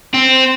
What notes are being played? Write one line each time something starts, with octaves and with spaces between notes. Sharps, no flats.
C4